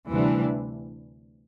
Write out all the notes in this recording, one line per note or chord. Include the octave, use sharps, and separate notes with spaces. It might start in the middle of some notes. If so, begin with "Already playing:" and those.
D2 C3 E3 G3 D4